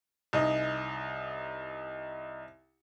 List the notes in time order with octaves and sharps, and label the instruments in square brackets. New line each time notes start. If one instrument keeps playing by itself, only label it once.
[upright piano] C2 D#4